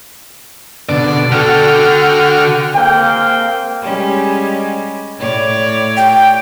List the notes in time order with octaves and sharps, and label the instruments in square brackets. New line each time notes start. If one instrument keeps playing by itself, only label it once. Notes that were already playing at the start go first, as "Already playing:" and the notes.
[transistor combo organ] B2 D3 [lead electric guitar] D5
[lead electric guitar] D3 A4 [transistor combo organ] F#4 G5 F6
[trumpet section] G#3 A#3 C4 F5 G5
[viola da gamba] G3 G#3 C#4
A2 C#5 D5
[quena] G5